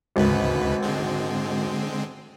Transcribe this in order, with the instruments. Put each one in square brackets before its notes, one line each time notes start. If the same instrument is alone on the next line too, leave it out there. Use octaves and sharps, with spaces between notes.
[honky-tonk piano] G#1 [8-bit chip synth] D2 C#3 B4
[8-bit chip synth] D3 G#3 C4